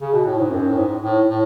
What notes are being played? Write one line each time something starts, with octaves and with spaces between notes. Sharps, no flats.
C#3
B2
A2
G#2
F#2
A2
G#2
A2
A2